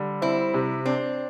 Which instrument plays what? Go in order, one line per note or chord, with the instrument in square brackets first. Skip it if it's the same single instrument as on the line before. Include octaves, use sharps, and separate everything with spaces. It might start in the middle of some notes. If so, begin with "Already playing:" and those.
Already playing: [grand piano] D3 G3
[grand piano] C4 [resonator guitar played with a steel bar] E4
[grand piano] C3
[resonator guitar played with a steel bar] C4 [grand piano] D4